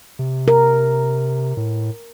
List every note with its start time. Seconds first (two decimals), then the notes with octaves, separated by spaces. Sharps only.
0.19 C3
0.48 A#4
1.57 A2